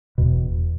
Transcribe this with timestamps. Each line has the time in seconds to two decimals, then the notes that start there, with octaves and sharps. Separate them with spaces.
0.18 E1 E2 B2